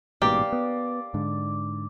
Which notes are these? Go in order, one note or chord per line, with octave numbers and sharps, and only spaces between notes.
A1 G#2 B2 A#3 G4 D5
B3
G#2 D3